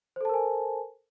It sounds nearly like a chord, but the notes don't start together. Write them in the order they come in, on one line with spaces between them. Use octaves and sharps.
C5 A4 A5 A#4 G#5